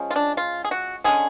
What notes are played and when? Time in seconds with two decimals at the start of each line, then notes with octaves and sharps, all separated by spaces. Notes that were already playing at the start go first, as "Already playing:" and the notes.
Already playing: F3 G#3 C#4
0.11 F4
0.16 D4
0.37 F4
0.65 G#4
0.71 F#4
1.04 D3 G#3 C#4 G#4